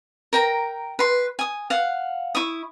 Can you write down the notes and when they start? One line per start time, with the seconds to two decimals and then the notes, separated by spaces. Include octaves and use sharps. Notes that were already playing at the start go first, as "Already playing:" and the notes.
0.33 A#4 G5 A#5
0.99 B4 C6
1.39 G#5 D#6
1.70 F5 F#5
2.35 E4 C#6 D#6